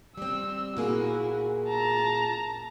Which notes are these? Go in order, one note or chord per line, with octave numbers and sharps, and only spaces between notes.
G3 C4 E6
A#2 A#3 E4 F#4 G#4
A5 A#5